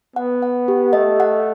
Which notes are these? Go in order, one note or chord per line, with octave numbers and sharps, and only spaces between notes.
B3 F#5
F#5
G4
A3 D#5
F#5